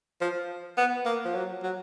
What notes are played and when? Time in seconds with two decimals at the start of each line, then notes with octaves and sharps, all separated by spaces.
0.21 F3
0.77 B3
1.06 A#3
1.25 F3
1.35 F#3
1.63 F#3